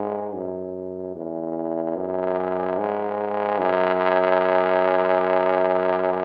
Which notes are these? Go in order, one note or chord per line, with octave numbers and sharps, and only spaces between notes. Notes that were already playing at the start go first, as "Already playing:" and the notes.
Already playing: G#2
F#2
E2
F#2
G#2
F#2